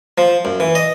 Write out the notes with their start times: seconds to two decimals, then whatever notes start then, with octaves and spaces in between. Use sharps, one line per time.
0.18 F3
0.45 F#2
0.60 E3
0.75 D#5